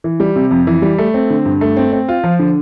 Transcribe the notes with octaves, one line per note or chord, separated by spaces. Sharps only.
E3
G3
C3
F2
E3
G3
A3
C4
D3
G2
A3
C4
C4
F4
F3
D3